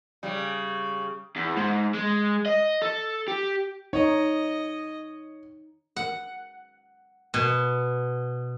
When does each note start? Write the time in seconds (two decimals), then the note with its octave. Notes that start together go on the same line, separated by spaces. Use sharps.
0.23 C#3 G3
1.36 E2
1.56 G#2
1.94 G#3
2.46 D#5
2.82 A4
3.28 G4
3.93 D#4 C#5 D#5
5.96 F#5
7.34 B2